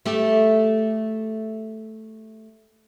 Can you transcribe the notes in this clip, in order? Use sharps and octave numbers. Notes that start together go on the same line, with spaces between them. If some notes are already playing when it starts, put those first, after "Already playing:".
A3 G4